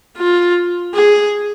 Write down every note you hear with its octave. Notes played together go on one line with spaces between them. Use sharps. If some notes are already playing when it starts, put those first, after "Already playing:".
F4
G#4